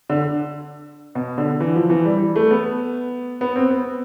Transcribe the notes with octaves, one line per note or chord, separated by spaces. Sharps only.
D3
B2
D3
E3
F3
E3
G3
A3
B3
B3
C4
B3